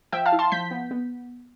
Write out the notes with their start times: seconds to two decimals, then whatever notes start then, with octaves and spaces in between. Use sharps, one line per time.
0.12 F3 E5 G5
0.26 F5 A5
0.33 E4
0.39 A5 C6
0.52 F3 G6 B6
0.71 B3
0.91 B3